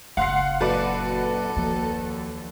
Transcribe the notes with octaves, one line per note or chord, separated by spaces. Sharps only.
F#1 F5 F#5 C6 C7
F#2 A#2 F#4 A4 B4 D5
D#2 F3 A#3